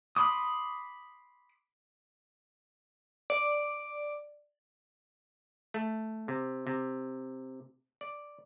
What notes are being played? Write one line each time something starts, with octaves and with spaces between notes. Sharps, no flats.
B5 C6 D6 D#6
D5
A3
C3
C3
D5